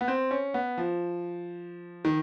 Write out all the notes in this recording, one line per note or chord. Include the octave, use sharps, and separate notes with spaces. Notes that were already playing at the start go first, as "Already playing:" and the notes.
B3
C4
C#4
B3
F3
D#3